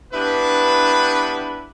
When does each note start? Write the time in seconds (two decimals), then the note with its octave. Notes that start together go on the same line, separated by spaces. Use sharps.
0.13 G2 B3 D4 E4 B4